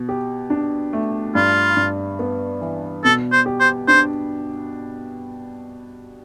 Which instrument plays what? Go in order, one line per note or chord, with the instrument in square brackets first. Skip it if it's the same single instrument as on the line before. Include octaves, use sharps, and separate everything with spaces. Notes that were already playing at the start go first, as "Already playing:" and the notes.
Already playing: [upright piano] B2
G4
D4
A3
[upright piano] G2 [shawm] F4
[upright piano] G2
B3
E3
[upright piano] B2 [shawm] A4
[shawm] C5
[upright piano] G4
[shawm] C5
[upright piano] D4 [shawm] C5